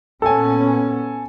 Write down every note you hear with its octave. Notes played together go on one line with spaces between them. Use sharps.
A#2 B3 C#4 A4 G#5